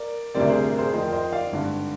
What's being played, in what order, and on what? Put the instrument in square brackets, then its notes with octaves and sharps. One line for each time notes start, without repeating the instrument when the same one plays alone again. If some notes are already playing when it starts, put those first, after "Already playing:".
Already playing: [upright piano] A#4 D5
D2 C3 G3 C4 A#4 D5
G#4 C5
A#4
G#4 C5
F2 D#3 A#3 F4 C5 D#5
C5 D#5
D5 F5
G#1 G2 D3